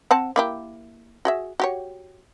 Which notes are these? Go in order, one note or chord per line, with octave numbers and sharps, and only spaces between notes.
C4 F#5 A5
A#3 E4 G4
F#4 G#4 E5
F#4 G4 C#5